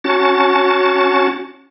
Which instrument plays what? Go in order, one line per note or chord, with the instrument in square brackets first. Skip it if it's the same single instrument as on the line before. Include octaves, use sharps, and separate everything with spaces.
[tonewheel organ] C#4 F#4 A5